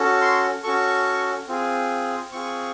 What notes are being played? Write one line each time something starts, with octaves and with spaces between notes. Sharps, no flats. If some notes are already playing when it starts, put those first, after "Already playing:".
Already playing: C#4 F#4 A4
C6
C#4 F#4 A4 C#6
C4 F4 G#4
C4 F4 G#4 C#6